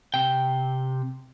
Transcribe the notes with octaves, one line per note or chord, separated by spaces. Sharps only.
C3 G5